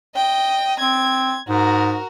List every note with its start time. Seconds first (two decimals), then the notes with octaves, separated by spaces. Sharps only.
0.16 D#5 G5
0.80 C4 G#6
1.49 G#2 F#4 A#4